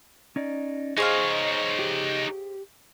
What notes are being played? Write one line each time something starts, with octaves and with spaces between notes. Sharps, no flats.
C#4 D#4 D5
D#4 G#4 C5 C#5 D#5 F5
G4